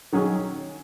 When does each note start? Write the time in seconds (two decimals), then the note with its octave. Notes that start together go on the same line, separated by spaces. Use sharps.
0.13 D#3 F#3 C#4 G#4